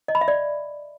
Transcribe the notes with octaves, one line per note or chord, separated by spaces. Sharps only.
D#5
B5
E5
D5